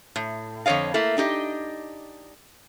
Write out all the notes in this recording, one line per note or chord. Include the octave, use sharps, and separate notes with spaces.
A2
F2 D3 C#5 D#5 F5
A3 A#3 E4
D4 D#4 G4 D#5